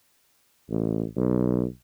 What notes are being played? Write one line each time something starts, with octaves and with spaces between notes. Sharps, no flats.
A1
B1